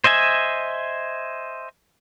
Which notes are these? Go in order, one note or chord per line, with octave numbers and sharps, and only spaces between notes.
C5 D#5 E5 G#5